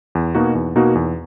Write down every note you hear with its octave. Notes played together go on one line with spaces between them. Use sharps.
E2
B2 A#3 D#4 F#4
E2
B2 A#3 D#4 F#4
E2